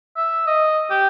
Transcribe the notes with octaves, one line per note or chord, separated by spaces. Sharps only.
E5
D#5
G4